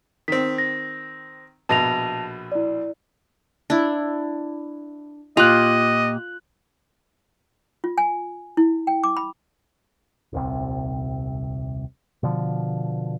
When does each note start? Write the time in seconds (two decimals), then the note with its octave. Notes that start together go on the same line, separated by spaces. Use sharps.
0.28 D#3 C4 B6
0.58 A#6
1.69 A#1 B2 A5 A#6 F7
2.52 E4 D5
3.70 D4 E4
5.37 A#2 F4 G4 D#5 F#6 F7
7.84 F4
7.98 G#5
8.57 E4
8.87 G5
9.04 D6
9.17 B5
10.33 D#1 C2 C3
12.23 B2 D3 F3